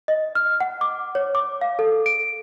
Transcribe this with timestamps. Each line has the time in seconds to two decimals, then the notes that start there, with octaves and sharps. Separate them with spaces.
0.08 D#5
0.35 F6
0.60 F#5
0.81 D6
1.15 C#5
1.35 D6
1.61 F5
1.79 A4
2.06 D7